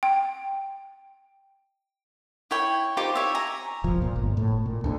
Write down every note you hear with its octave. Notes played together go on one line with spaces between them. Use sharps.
G5
E4 C#5 G5
D#4 F4 G4 C5
C#5 E5
G#5 A#5
D#1 G#1 F3
A#2
G1
A2
A#2
D2 D3